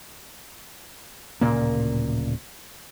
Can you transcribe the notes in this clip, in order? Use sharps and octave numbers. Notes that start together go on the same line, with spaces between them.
D1 A#2 C#3 A#3